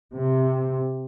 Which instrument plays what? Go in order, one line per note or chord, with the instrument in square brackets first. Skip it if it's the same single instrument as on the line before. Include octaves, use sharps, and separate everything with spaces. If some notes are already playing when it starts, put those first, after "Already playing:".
[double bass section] C3